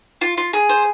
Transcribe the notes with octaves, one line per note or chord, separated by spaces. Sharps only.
F4
F4
G#4
C5